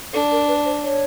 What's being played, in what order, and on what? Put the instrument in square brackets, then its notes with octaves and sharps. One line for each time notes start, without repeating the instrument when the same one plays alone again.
[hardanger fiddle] D4 [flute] A4
[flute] A#4
B4
C5
C#5